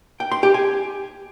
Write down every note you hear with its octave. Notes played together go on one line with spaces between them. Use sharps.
G5
C6
G4
G#5